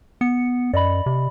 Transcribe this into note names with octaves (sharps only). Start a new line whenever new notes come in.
B3 C#7
F#2 D5 D#5 B5
C3